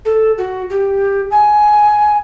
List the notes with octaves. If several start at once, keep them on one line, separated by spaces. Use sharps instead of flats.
A4
F#4
G4
G#5